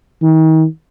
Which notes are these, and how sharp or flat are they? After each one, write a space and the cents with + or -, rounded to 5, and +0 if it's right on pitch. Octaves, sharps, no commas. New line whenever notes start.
D#3 +35